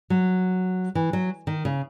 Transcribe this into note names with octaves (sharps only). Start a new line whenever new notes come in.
F#3
E3
F#3
D#3
C#3